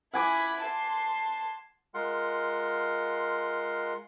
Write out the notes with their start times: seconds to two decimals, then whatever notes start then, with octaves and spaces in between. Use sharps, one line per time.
0.14 E4 F#5 G#5 B5 D6
0.60 A5 C6
1.94 G#3 F4 A#4 F#5 C6